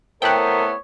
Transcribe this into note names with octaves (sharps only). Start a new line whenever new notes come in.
A3 B3 C4 E4 A#4 C#5 F#5 G5